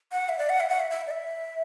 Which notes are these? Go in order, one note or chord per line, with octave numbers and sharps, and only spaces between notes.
F#5
E5
D5
F#5
E5
F#5
E5
E5
D5
E5